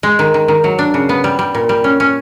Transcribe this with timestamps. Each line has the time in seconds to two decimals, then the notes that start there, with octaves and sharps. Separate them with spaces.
0.03 G#3
0.19 D#3
0.34 D#3
0.48 D#3
0.64 F#3
0.79 D4
0.94 C#3
1.09 B3
1.24 G3
1.39 G3
1.55 A#2
1.69 G3
1.84 C#4
2.00 C#4